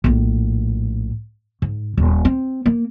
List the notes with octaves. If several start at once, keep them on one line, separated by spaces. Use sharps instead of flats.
A#1 A2
G#2
D#1
C4
A#3